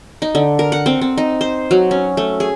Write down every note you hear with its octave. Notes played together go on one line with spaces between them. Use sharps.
D#4
D3
A#4
F#5
C4
C4
D#4
C5
F#3
C#4
A3
G#4